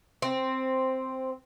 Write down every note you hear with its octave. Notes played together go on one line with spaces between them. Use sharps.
C4